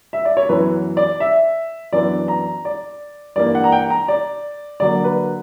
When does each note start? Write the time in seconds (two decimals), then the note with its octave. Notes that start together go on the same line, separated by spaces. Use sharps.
0.13 E5
0.25 D5
0.37 C#5
0.48 F#2 E3 B3 B4
0.97 D5
1.20 E5
1.93 F#2 E3 B3 D4 D5
2.28 A#5
2.65 D5
3.36 G2 E3 A#3 D4 D5
3.55 F#5
3.64 A#5
3.72 G5
3.90 A#5
4.08 D5
4.80 D3 F#3 A#3 D5
5.04 B4